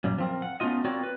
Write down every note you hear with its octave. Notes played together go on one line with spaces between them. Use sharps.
F#2 A#2 G3
F3 C4 A#4
F#5
A3 B3 C#4 D#4 F4 D#5
C4 F4 F#4 A#4 C#5 D5
B4